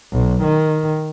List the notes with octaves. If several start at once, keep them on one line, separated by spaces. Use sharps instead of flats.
B1
D#3